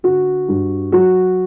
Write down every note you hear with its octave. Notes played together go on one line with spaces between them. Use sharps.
D3 F#4
G2
F#3 F#4